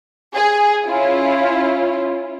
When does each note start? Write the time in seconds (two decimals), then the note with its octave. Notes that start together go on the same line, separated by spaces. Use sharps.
0.35 G#4
0.85 C#4 E4 F4